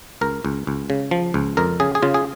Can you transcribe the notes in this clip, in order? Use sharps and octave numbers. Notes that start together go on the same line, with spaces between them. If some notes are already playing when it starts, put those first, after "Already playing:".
C#2 A#4
C#2
C#2
C#3
F3
C#2
F2 A#4
C#3 G#4
G#4
C#3 F4
G#4